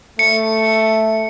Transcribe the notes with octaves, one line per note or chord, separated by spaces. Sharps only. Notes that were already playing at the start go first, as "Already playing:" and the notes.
A3 C#7